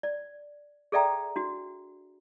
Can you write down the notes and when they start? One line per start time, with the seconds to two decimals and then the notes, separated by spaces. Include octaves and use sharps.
0.03 D5
0.92 G#4 A4 D5 E5 G5 A#5
1.36 D4 F#4